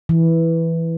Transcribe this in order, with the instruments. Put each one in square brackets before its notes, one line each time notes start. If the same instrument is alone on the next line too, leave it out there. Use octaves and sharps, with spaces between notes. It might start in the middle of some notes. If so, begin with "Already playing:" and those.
[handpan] E3